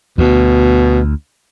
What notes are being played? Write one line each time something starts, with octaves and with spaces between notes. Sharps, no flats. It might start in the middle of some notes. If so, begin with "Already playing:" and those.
D2 B2